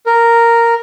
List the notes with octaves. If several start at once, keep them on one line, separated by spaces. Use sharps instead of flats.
A#4